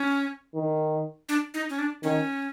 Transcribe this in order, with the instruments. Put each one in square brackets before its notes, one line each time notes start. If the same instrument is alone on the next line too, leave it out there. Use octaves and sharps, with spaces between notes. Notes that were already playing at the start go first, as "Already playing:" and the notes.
Already playing: [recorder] C#4
[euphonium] D#3
[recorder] D4
D#4
C#4
D4
[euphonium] D#3 [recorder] C#4